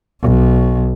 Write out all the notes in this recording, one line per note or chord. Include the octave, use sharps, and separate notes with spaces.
B1